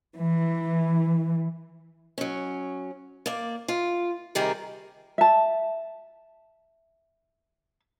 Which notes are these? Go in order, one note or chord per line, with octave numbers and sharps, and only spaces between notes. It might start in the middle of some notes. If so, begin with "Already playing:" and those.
E3
F#3 C#4
A#3 D5
F4
C3 D#3 G3 G4 G#4 A#4
E5 A5